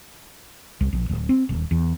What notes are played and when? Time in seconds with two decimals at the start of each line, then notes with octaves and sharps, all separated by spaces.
0.81 C2
0.93 A#1
1.09 D1
1.29 C4
1.49 D#1
1.71 E2